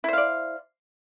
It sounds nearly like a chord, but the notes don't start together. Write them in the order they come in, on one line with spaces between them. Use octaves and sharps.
E4 C5 F5 D5